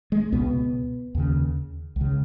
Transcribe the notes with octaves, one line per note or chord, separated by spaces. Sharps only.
G#3
C#2 B2 B3
D#2 C#3
C#2
C#3